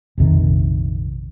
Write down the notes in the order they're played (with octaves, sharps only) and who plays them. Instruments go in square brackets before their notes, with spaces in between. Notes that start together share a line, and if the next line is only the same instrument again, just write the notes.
[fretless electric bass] A#1 F2 C3 D#3